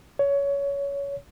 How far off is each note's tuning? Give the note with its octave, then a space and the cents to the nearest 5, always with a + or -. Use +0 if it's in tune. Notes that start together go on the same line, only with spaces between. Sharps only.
C#5 +20